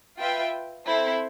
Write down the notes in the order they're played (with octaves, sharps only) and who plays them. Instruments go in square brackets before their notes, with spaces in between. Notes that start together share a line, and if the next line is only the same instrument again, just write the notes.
[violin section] F4 B4 E5 G5
C4 E4 A4 C5